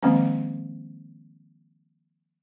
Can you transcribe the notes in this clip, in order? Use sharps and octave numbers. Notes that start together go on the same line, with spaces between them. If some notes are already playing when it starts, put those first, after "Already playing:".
D#3 F3 G#3 A#3 C4 C#4